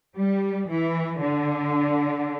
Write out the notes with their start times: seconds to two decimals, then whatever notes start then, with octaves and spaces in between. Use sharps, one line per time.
0.17 G3
0.69 E3
1.21 D3